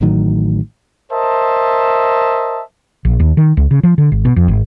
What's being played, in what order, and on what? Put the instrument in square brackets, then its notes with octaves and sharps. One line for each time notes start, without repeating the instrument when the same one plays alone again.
[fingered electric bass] A1 A2 D#3 F#3
[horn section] A#4 C5 D#5 E5 A5
[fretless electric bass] A#1
D#2
D#3
C#2
C#3
F3
D3
G#1
B2
F2
G#1